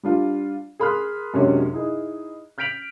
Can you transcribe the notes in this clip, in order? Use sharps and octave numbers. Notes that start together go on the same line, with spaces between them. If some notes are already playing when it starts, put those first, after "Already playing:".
G3 D4 F4
G#4 A#4 B5 C6 F6 F#6
F#2 C3 F#3 G#3 C#4 D4
D#4 E4 G#4
F6 G6 B6 D7 F7 F#7